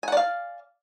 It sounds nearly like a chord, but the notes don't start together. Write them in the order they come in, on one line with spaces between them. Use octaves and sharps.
G#5 F#5 D5 F5